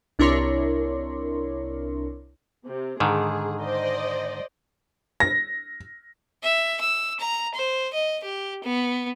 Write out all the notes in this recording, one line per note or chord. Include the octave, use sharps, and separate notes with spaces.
C2 D4 E4 A#4 C#5 C6
C3
G#2 D3 D#3 G#4
C5 D5 D#5
A#6
E5
E6
A#5
C5
D#5
G4
B3